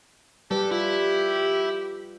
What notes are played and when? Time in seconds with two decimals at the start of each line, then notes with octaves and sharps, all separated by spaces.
0.51 G3 G4 A4 B4
0.71 E4 F4